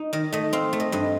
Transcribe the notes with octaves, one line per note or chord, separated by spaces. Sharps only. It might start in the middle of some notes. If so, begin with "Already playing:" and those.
Already playing: D#4
D#3 D#5
A3 D#5
C4 F5
A3
D#5
G2 D#5